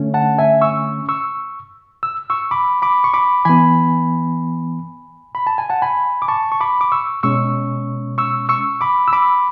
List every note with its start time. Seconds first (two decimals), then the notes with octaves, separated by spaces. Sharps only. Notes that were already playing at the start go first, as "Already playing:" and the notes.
Already playing: D3 A3 C#4
0.14 F#5 A5
0.39 E5 G#5
0.61 C#6 E6
1.09 C#6 E6
2.03 E6
2.30 C#6 E6
2.51 B5 D6
2.82 B5 D6
3.04 C#6
3.14 B5 D6
3.45 E3 B3 G#5 B5
5.35 B5
5.47 A5
5.58 G#5
5.70 F#5 A5
5.82 G#5 B5
6.22 D6
6.28 A5 C#6
6.52 C#6
6.61 B5 D6
6.81 D6
6.92 C#6 E6
7.23 B2 G#3 C#4 C#6 E6
8.18 C#6 E6
8.49 C#6 E6
8.81 B5 D6
9.08 E6
9.13 B5 D6